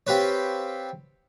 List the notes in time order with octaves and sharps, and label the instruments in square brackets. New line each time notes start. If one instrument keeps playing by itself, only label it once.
[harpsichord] C4 F4 G4 B4 C#5